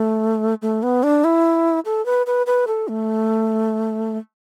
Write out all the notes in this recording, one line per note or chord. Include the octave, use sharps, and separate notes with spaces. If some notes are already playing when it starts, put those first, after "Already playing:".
Already playing: A3
A3
B3
D4
E4
A4
B4
B4
B4
A4
A3